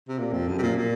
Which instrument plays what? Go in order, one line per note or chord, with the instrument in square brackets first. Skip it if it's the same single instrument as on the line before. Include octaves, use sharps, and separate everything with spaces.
[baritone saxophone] C3
A#2
F2
F#2
C3
A#2
A#2